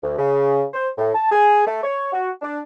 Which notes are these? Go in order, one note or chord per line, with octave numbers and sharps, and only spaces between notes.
D2
C#3
C5
A2
A5
G#4
A3
C#5
F#4
D4